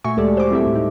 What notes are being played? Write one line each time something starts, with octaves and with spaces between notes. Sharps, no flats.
A#2 A3 F#4 E5 G#5 C#6
D2 G#3 A3 G4 A4 D5
C5 D6
G3 C4 E4 G4 A4 E5
A2 A3
D#4